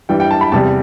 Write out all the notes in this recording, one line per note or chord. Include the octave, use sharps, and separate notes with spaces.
G2 E3 G3 G5
G5
A5
B5
E2 C3 G3 A5